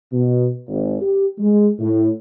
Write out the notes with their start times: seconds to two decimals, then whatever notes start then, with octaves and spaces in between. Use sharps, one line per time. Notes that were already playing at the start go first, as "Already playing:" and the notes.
0.13 B2
0.68 G#1
1.02 G4
1.39 G#3
1.80 A2